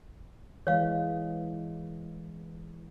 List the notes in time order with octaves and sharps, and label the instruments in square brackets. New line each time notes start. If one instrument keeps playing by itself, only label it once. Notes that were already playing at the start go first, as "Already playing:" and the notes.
[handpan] E3 G#3 [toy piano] C#5 F5